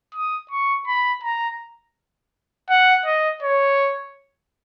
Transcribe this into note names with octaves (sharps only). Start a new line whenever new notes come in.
D#6
C#6
B5
A#5
F#5
D#5
C#5